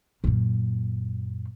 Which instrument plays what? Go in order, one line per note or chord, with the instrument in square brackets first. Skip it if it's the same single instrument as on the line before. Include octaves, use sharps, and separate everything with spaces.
[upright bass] F#2 A#2